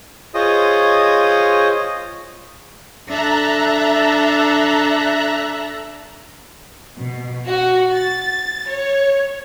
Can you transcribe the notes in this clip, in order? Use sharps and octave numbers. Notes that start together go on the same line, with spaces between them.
F4 G#4 C5 C#5 D#5 D#6
D4 A4 E5 A#5 F#6
B2
F#4
A6
C#5